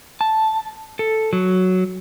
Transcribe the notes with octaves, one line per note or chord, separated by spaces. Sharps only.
A5
A4
F#3